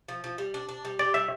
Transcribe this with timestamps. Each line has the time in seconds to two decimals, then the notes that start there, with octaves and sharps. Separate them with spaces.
0.08 F3
0.24 F3
0.38 G3
0.54 D4
0.69 D4
0.85 G3
0.99 G4 D5
1.14 G3 E5